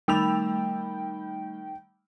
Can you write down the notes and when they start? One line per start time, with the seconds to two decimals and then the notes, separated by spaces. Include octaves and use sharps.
0.08 D#3 G3 A3 G5 B5 E6 F7